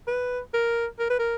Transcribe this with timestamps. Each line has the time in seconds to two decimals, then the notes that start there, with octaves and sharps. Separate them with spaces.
0.07 B4
0.54 A#4
0.99 A#4
1.10 B4
1.19 A#4